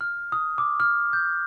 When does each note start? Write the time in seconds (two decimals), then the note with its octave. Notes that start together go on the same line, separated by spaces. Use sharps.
0.01 F6
0.32 D#6
0.58 D6
0.80 F6
1.13 G6